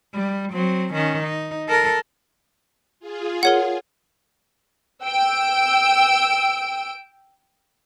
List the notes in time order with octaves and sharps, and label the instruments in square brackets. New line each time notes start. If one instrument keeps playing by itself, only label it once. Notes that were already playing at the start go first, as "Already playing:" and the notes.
[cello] G3
F#3 C4
D#3 C#4
D#4
A4 A#4
[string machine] F4 G#4
[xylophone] A#4 C#5 F#5
[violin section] G5 E6 D7